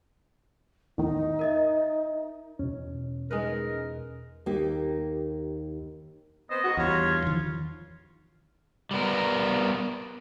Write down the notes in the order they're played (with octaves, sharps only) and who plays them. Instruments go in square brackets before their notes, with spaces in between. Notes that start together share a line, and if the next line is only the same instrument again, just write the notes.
[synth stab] E2 A2 D#3 [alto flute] D#4
[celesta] A#4 D#5 E5
[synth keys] E2 B2 [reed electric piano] C#4
[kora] G#3 D#4 B4 [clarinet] A#4
[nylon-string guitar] D#2 A#3 D#4 G4
[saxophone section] B3 C4 C5 [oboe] D#5
[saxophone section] G#2 F#4
[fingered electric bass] E2 [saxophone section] G2 C#5 [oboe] F4
[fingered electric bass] D#3 F3
[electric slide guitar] G3 B3 A#4